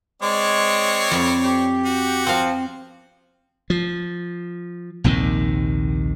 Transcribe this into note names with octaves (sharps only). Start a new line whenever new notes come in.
G#3 C4 C#5 D5
F2 B5
G4
F#4
F3 C4 F5
F3
A#1 D#2 C3 D#3